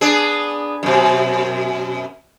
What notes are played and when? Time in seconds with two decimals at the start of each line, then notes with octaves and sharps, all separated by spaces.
0.01 B3 D4 G#4
0.83 F#2 B2